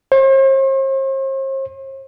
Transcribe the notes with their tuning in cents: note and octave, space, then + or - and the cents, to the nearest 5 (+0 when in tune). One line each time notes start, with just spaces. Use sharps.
C5 +45